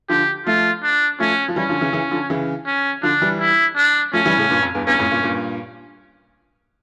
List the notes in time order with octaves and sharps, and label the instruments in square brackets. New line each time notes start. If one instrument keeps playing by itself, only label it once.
[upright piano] D3 F3 [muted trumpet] G4
[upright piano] F3 A3 [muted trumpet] F4
[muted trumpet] D4
[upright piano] F3 A3 [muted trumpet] C#4
[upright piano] F3
[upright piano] E3 G3 [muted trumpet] C#4
[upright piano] D3 F3
C#3 E3
C#3 E3
D3 F3
C#3 E3
[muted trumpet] C#4
[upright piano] D3 F3 [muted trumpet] D4
[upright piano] E3 G3
[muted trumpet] E4
D4
[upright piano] F3 A3 [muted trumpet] C#4
[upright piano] E3 G3
A2 C#3
G2 A#2
F2
E2 G2
[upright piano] E2 G2 [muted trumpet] C#4
[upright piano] F2 A2
G2 A#2
G2 A#2